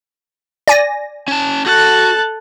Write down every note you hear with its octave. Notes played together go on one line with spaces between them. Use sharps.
D5 G#5 A#6
C#4 A5
F#4 A4 F#6 A6